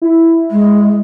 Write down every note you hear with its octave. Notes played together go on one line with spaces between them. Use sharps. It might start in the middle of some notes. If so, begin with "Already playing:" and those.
E4
G#3